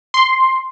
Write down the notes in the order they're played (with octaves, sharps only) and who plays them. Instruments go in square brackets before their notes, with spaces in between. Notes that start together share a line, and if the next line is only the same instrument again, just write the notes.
[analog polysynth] C6